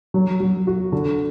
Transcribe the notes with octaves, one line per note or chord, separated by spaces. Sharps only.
F#3
F#3
F#4
D3